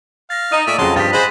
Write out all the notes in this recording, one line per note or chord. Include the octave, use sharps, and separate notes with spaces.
F5 A6 A#6
D#4 D#6 D#7
A#2 A3 D5 E5
F2 C#3 F#3 A5 C6
G2 F3 G4 A6 B6
G#4 C5 D#5 F#5 B5